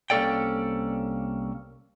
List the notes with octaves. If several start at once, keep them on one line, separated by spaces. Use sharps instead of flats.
C2 A#3 C#4 A4 D5 G5